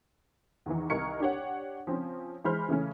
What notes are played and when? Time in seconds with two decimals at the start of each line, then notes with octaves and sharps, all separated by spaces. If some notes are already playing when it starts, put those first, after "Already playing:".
0.66 E2 D#3 E3
0.90 C2 D#4 A#4 C#6 G#6 C#7
1.20 D4 G4 C#5 F#5
1.87 F3 C4 C#4
2.44 E3 G#3 C5 B5 F6
2.69 C#3 E3 A3 C#4